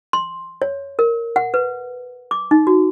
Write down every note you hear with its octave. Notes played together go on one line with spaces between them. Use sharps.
C6
C#5
A#4
F#5
B4
D6
D#4
F#4